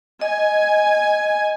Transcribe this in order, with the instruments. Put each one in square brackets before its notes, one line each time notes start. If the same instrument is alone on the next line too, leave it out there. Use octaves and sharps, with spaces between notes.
[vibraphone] D#5 [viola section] G#5